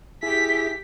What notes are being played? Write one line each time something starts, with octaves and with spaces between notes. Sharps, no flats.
E4 G4 G#4 B6